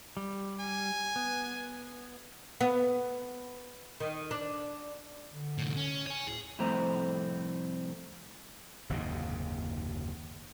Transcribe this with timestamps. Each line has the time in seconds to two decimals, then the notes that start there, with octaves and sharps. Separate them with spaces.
0.17 G3
0.60 G#5
1.16 B3
2.61 B3
4.00 D#3
4.31 D4
5.32 D3
5.58 C2 A2
5.76 C#4
6.07 C#5 G#5
6.27 D2 A2 G#4
6.59 C2 F2 A2 A3 C4 A#5
8.89 F#1 D#2 G#2 C3